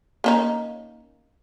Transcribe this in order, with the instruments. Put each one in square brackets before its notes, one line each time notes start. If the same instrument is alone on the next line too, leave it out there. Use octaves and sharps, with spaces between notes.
[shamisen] A#3 C#4 D#4